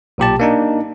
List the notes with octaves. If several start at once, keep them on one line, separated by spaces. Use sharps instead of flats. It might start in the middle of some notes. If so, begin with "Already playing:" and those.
B1 A#2 G4 A5
A#3 D4 D#4